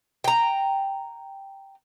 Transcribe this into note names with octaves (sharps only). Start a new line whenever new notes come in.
G5 A#5